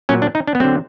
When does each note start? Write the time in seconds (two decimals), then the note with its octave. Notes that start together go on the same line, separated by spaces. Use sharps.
0.09 A#2 F#3 C#4
0.22 D4
0.35 D#4
0.47 D4
0.55 B3
0.60 D3 F#3 C4